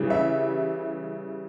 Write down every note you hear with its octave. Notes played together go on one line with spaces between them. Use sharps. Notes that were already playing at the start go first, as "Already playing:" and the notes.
Already playing: C#3 E3 G3
E5